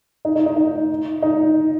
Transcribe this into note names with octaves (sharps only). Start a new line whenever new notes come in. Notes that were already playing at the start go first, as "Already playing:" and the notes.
D#4
D#4
D#4
D#4
D#4